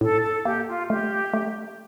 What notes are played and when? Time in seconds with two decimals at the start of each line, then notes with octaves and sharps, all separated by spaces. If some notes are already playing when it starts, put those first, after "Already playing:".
0.01 A2 A4
0.23 A4
0.45 A#3 G4
0.68 F4
0.90 A3 G4
1.33 A3